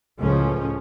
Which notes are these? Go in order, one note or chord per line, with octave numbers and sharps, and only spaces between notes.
C#2 A2 C#3 F3 C#4